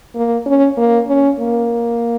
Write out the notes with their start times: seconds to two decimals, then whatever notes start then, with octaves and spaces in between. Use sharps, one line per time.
0.15 A#3
0.46 C#4
0.77 A#3
1.08 C#4
1.39 A#3